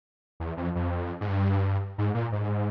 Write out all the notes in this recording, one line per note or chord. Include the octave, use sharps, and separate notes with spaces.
E2
F2
F2
G#2
G2
G#2
A#2
G#2